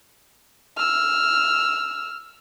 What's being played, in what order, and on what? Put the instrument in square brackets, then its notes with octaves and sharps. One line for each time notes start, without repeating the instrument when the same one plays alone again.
[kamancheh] E6 F6